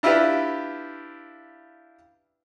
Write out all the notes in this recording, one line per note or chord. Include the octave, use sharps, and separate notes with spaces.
D4 E4 F4 G4 B4 E5